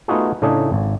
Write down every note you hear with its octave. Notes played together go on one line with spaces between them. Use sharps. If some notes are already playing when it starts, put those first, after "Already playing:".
A3 B3 D#4 F4 F#4 G#4
A2 C#3 A3 D4 D#4 G#4
G#1